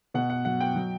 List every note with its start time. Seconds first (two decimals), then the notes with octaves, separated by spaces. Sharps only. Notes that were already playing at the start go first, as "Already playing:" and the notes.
0.14 B2 F#5
0.30 F#5
0.45 F#3 F#5
0.60 G5
0.76 F#3